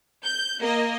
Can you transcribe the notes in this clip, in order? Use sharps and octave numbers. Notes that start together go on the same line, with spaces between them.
G6
A#3 D#5